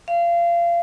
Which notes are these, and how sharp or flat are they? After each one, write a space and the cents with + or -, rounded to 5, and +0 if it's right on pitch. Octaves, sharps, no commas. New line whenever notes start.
F5 -25